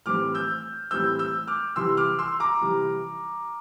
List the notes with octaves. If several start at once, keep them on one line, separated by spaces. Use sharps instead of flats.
A2 E3 G3 C4 D6 F6
E6 G6
A2 E3 G3 C4 E6 G6
E6 G6
D6 F6
C3 E3 G3 C6 E6
D6 F6
C6 E6
A#5 D6
C3 E3 G3